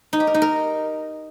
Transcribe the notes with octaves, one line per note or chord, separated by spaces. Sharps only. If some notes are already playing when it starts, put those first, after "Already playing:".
D#4
G4
A#4
D#4
A#4